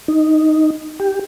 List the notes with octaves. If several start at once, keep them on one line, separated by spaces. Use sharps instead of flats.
D#4
G4